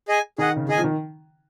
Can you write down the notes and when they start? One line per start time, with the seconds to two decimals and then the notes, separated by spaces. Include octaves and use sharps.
0.08 G#4 D#5 G#5
0.38 D#3 G#4 D#5 F#5
0.56 C#3
0.69 D#3 G#4 D#5 G#5
0.78 F3
0.84 D#3